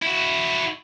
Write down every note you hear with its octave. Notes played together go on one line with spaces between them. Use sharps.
E4 F#4